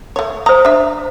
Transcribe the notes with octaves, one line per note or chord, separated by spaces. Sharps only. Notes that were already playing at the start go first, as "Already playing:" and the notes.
A3 C#5
C5 A#5 D#6
D4 E5